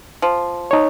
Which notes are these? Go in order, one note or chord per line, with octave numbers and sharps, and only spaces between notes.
F3
D#4 C#5